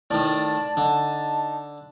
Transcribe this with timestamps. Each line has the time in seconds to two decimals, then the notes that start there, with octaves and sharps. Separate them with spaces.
0.11 A2 D#3 D5 A5
0.77 D3 D#4